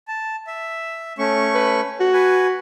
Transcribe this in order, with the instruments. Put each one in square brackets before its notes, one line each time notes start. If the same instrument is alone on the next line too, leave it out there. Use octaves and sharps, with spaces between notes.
[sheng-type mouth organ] A5
E5
A3 C#4 C#6
[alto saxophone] B4
F#4
[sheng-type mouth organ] B4 G#5